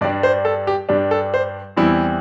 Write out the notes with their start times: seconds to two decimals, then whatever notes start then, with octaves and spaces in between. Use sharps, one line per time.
0.01 G2 G3 D4 D5
0.23 C5
0.45 A4
0.67 G4
0.89 G2 G3 D4 G4
1.11 A4
1.34 C5
1.76 E2 E3 G3 C4 E4